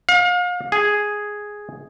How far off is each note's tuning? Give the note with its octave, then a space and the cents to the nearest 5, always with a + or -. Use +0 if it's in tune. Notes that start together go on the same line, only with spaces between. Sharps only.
F5 +35
G#4 +0